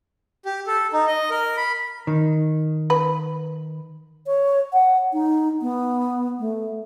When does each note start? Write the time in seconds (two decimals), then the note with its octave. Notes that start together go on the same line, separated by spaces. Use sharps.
0.45 G4
0.67 A4
0.93 D#4
1.07 D#5
1.30 A#4
1.57 B5
2.07 D#3
2.90 B4
4.26 C#5
4.73 F#5
5.13 D#4
5.62 B3
6.39 A3